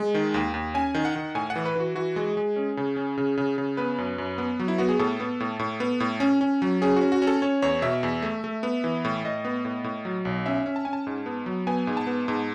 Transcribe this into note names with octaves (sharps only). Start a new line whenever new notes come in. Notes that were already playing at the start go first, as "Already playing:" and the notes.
Already playing: G#3
D#3
D#2
D#2
C#4 G#5
D#3
F#5
D#3
A2 G#5
F#5
E3
B4
E3 F#4
E3 F#4
G#3
G#4
G#3
C#4
C#3
C#4
C#3
C#3
C#3
B3 B4
F#2
F#2
B3
F#3
E4
B3 F#4
G#4
A2 A4
B3
A2
A2
B3
A2
C#4
C#4
F#3
C#4 G#4
F#4
C#4
F#4
C#4
A4
C#4 C#5
E2 C#5
B2 E5
E2
A3
A3
B3
E3
A2
A2 D#5
B3
A2
A2
F#3
B1
C#4 E5
C#4
A5
C#4 G#5
A5
G#2
B3
F#3
B3 G#5
G#2
A5
B3
G#2